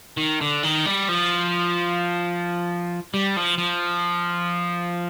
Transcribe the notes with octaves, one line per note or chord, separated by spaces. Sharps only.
D#3
D3
D#3
G3
F3
G3
F3
F3